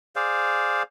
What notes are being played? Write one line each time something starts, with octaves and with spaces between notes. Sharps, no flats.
G#4 C5 D5 F5